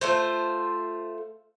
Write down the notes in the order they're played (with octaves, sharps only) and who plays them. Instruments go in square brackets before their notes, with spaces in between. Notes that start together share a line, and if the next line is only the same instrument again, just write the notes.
[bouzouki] A3 F4 C5